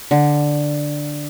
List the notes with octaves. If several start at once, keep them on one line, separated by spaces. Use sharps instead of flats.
D3